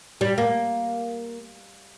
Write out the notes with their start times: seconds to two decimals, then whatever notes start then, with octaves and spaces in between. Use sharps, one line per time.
0.21 G3
0.38 A#3